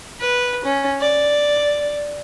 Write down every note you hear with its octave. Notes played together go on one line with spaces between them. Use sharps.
B4
C#4
D5